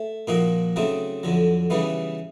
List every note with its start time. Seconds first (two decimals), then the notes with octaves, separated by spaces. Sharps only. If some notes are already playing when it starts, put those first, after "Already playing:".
Already playing: A3
0.28 A#2 F3 A#3 D#4 F#4
0.76 C#3 F#3 A3 C4 D#4
1.23 F2 D3 F#3
1.70 C#3 E3 G3 B3 D#4